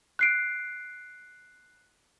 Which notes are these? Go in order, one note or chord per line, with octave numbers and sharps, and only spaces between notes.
F#6 C7 D7